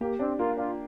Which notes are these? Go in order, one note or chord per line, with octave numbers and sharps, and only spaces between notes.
A#3 G4
C4 D4
A#3 F4
D4 F4